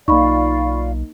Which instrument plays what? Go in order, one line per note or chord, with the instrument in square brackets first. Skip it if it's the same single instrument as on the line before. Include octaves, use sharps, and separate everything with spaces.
[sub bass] B1 [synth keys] A#3 D#4 [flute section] F4 D5 F5 [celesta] B5 C#6